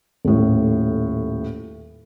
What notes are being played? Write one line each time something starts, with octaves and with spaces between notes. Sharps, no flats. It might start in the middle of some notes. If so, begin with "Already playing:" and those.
D#1 A2